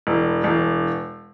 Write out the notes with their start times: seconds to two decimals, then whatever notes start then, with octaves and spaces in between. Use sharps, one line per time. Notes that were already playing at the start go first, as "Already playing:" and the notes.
0.07 E1
0.44 E1